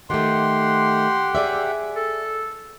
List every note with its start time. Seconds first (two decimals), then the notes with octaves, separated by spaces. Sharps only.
0.10 D#3 A3 G4 F#5 G5 C6
1.35 G#4 D5 E5
1.96 A4